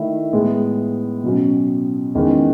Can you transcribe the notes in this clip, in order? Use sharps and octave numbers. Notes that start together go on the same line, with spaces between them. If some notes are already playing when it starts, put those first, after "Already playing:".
Already playing: D#3 A3 E4
A2 G#3 B3
B2 F#3 C#4
E2 D#3 G#3 C#4